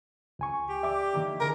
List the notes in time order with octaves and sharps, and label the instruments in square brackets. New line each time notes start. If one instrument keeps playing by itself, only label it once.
[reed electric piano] C#2 G#5 C#6
[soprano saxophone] G4
[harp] D5 [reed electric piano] E5 D6
[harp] D#3 A#3 E4
[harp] D3 G4 G#4 [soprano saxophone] A#4